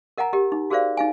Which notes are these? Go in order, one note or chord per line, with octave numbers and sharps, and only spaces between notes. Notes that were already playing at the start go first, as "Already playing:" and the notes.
A#4 D#5 F#5 G#5 A#5
G4 A#4 D#5
D#4
F#4 G#4 A#4 C5 D5 F5
D#4 F5 G#5